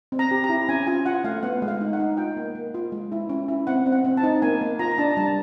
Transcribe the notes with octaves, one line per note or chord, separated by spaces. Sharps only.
C4
A#5
G4
A#5
E4
C#4 G#5
F4 G#5
F4 F#5
A3 F5
B3 F#5
G#3
F5
D#4
F#5
D#4
F4 G5
A#3
A#3
F4
G#3
E4
C#4
E4
C4 F#5
C4
F#5
C4
A5
D#4
A#3 G#5
A#3
F4 A#5
A#5
D4 A5
A#5
G3 A5